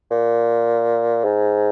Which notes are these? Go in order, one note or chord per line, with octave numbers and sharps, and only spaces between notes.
A#2
G#2